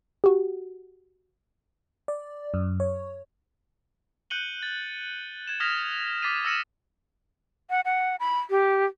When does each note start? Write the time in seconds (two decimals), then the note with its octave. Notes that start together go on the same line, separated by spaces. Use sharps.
0.24 F#4 G4
2.08 D5
2.54 F#2
2.80 C#5
4.30 F#6 G6 C#7 D#7 F#7 G7
4.63 A6
5.47 G#6 E7
5.60 D#6 F6 G#6 A#6 B6 F7
6.22 D6 A6 B6 C7 D#7
6.45 E6 F6 A#6 C#7 D#7 E7
7.70 F#5
7.85 F#5
8.20 B5
8.50 G4